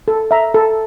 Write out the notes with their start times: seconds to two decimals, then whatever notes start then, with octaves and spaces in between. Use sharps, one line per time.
0.08 A4
0.31 E5 A#5
0.54 A4